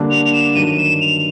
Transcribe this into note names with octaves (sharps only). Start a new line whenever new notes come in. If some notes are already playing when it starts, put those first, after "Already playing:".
Already playing: D3 G3 A#3 D4
F7
F7
E7
G2 D#3 F#3 D#7
E7
F7